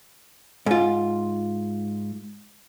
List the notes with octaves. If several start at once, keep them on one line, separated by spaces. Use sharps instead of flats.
G#2 F4